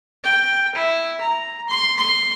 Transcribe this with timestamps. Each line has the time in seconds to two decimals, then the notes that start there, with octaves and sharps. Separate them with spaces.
0.24 G5
0.76 E4
1.21 A#5
1.69 C6
1.97 C6